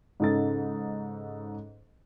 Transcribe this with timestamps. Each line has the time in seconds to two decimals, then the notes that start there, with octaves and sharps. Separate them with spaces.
0.20 G#2 C#3 D#4 A4 A6